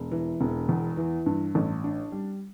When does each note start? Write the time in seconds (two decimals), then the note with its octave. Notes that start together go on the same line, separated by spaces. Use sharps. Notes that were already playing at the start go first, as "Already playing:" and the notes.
Already playing: E1
0.11 E3
0.41 E1
0.69 E2
0.97 E3
1.26 G2
1.55 A1
1.84 D4
2.12 G3